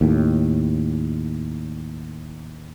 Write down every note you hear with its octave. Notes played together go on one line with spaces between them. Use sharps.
D#2 A2